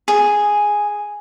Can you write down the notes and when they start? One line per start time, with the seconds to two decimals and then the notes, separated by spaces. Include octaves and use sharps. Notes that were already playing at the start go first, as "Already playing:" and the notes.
0.08 G#4